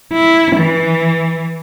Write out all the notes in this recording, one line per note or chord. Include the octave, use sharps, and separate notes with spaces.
E4
E3